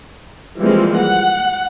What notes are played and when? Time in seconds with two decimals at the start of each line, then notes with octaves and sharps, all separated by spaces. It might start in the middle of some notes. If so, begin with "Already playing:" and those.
0.58 E3 F3 G3 G#3 A#3 C4
0.97 F#5